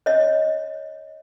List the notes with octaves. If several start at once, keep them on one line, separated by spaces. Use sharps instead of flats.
C#5 D#5